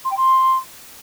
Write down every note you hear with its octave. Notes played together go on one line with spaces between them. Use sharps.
C6
G5
C6